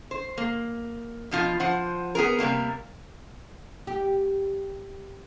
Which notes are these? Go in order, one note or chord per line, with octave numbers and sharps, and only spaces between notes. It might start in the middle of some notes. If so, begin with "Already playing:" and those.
C5
A#3
B2 F3 F4
F3 C5 F#5
B3 G#4 A#4
C3 G3 A#3 A#4
G4